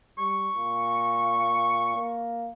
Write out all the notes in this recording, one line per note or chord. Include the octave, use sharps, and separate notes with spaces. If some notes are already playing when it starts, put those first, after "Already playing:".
G3 C#6
A#2
A#3